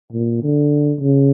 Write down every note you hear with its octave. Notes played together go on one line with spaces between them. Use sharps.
A#2
D3
C#3